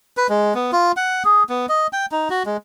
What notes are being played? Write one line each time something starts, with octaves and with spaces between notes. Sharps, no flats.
B4
G#3
B3
F4
F#5
G#4
B3
D#5
G5
D#4
F#4
G#3